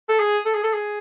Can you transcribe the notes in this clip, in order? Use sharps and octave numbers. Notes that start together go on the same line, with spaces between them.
A4
G#4
A4
G#4
A4
G#4